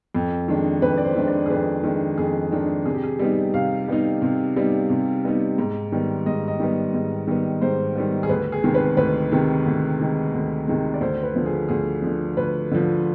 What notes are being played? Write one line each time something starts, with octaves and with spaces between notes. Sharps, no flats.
F2
D#3 G#3 D4
F2 B4
D5
C5
D#3 G#3 D4
D5
G#4
F2 B4
D#3 G#3 D4
F2 G#4
D#3 G#3 D4
C3 G#4
G4
G#4
G3 B3 D#4
C3 F5
G3 B3 D#4
C3
G3 B3 D#4
C3
G3 B3 D#4
G#2
D#3 G3 B3
G#2 D#5
D#5
D#3 G3 B3
G#2
D#3 G3 B3
G#2 C5
D#3 G3 B3
G#4
D2 B4
G#4
C3 D#3 G#3
B4
D2 B4
C3 D#3 G#3
D2
C3 D#3 G#3
D2
C3 D#3 G#3
D5
D2 C5
B4
D3 F3
G#4
D2 G#4
D3 F3
D2 B4
D3 F3